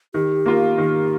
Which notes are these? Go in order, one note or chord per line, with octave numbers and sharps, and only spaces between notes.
D#3 G4
A#3 F4 A#4
D#3